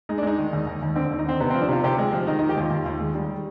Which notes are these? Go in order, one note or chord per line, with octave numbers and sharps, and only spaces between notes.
G#3 D#4
D4
G#3 D#4
D#3
D#2
D#2
D#2
D3 C4
D#2
D#4
D3 C4
C3 B3
C4
F3
D4
C3 F4
C3 G4
G#3
F3
D#3 D#4
D#4
D#3
G4
D#2 F4
D#2
D#2
G#3
G3